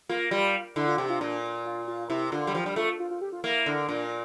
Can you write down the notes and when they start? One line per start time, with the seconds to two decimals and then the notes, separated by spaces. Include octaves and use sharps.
0.09 A#3 F4
0.31 G3 F4
0.76 D3 E4
0.88 F4
0.98 C3 G4
1.10 F4
1.21 A#2 D4
1.66 F4
1.88 F4
2.10 C3 E4
2.32 D3 F4
2.47 G3
2.55 F3 G4
2.66 G3
2.76 A3 F4
3.00 F4
3.11 F4
3.21 G4
3.33 F4
3.44 A#3 E4
3.66 D3
3.89 A#2 D4